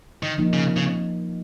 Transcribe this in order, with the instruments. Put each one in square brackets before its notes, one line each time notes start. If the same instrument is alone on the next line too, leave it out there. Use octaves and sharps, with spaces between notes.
[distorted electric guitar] D#3
[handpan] F3 A#3 D#4
[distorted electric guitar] C#3
C#3